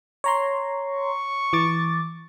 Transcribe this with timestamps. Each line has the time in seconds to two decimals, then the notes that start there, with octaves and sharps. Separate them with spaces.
0.24 C#5 A#5 C6
0.75 C#6
1.53 E3 D6 A6